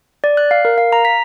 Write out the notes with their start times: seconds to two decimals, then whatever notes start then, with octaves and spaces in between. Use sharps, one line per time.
0.24 D5
0.37 F#6
0.51 F5
0.65 A#4
0.78 F5
0.93 A#5
1.05 B6